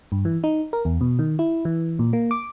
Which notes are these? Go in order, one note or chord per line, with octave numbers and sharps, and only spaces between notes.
G2
E3
D#4
A#4
E2
B2
D#3
E4
E3
A#2
A#3
D6